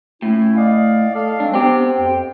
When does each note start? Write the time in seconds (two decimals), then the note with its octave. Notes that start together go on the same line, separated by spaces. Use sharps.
0.22 A2 C#4 E4
0.56 D5 D#5 F5
1.15 A4 D5 F5
1.40 F#3 G#3 C4 D4
1.54 B3 C4 G4
1.97 F2 G5